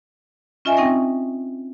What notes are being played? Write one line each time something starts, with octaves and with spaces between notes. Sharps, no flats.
C#4 F4 D#5 E5 G#5
C4 D#4 G5 C#6 A#6